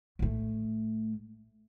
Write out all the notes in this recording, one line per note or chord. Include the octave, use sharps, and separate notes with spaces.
A2 A3